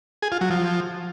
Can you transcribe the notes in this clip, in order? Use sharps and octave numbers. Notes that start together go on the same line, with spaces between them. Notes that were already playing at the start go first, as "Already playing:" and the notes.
G#4
F4
F#3
F3